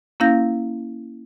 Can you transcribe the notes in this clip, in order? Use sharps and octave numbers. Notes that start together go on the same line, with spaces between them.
A#3 C#4 E4 F5 G6 A#6